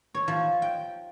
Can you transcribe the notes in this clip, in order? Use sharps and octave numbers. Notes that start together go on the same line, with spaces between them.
C#5
F3
G5